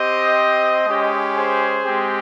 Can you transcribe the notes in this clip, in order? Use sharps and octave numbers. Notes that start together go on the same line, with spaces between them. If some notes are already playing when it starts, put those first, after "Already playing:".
Already playing: C4 G4 C5 D#5
G#3 C#4 G4
G#4 C5
G#3 C4 G4